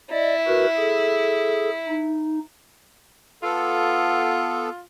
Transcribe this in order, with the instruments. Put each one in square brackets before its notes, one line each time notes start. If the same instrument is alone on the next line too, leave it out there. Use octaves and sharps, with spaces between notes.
[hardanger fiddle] E4 [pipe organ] D5 D#5
[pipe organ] F#4 A#4 B4
G#4 A4
D#4
[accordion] B3 A4 [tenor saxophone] F4